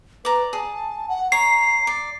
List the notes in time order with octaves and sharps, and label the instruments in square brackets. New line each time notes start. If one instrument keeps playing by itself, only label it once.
[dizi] B4 [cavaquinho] D5 A#5
[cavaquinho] G#4 [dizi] A5
[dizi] F#5
[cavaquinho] C#5 [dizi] A#5 [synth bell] C7
[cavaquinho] D5